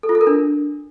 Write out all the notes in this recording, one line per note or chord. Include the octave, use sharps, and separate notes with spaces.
A4
F4
A4
A#4
D4